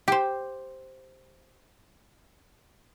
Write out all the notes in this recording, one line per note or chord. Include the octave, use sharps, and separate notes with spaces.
G4 C5